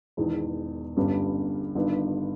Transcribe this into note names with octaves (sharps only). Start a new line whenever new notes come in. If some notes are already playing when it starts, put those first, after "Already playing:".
E1 E2 D#3
G1 G2 G3 C#4
G1 G2 D#3